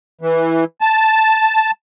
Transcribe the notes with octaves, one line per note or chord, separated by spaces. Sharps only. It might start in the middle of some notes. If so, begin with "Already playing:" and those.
E3
A5